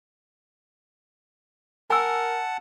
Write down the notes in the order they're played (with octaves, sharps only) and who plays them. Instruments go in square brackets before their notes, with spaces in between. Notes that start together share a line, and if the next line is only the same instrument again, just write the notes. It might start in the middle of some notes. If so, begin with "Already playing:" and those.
[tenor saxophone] A#4 [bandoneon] F#5 A5 [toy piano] G#5 E6